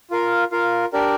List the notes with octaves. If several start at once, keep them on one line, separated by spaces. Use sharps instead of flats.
F4 A#4 F5
F4 A#4 F5
D4 G4 A#4 D5